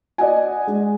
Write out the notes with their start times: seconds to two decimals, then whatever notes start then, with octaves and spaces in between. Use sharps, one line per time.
0.18 D5 D#5 F#5 G#5
0.67 G#3